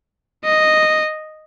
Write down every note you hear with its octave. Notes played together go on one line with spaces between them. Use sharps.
D#5